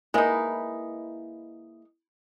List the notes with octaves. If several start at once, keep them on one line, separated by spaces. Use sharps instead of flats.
G#3 A#3 D#4 E4 B4